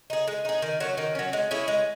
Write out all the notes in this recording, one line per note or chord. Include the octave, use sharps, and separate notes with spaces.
D#4 G#4
G#3
D#4 G#4
D#3
F#3 C#4
D#3
F#3 C#4
G#3
C#4 E4 G#4
G#3